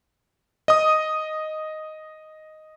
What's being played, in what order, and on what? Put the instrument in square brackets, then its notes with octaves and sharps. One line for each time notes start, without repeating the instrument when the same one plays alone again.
[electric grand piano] D#5 D#6